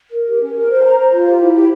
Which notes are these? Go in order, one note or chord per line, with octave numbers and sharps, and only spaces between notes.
A#4
G4
C#4
A#4
C5
A#5
C5
F4
G4
E4
G4